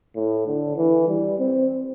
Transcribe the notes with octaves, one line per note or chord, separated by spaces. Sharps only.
A2
D3
E3
G3
C4